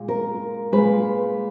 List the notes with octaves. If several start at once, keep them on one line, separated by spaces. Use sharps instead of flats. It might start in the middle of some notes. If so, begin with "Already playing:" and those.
Already playing: A#2 G#3
A#4
A#2 G#3 B4